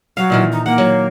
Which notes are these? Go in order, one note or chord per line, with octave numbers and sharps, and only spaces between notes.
F#3 F5
A#2 D#3 E3
D#4
A#3 F#5
F#3